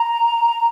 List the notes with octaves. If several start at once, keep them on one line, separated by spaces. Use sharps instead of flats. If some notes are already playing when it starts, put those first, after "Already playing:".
Already playing: A#5